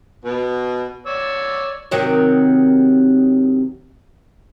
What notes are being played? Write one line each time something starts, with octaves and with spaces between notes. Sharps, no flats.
B2
C#5 D5 E6
C3 D#3 F#3